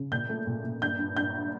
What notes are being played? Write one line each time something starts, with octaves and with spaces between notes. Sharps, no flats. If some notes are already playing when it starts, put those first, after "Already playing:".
Already playing: C#3
A#2 G6
A3
A#2
A#2
G2 G6
G2
G2 G6